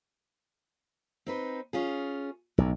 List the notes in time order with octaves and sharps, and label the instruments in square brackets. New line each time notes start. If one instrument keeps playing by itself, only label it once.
[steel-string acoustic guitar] C4 D#4 B4
C#4 F4 G#4
[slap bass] B1 [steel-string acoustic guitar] A2